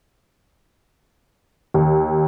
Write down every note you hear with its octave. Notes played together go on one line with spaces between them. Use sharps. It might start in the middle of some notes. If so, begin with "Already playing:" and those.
D#2